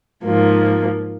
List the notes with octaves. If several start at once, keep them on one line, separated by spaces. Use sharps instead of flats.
G#2 F3 A#3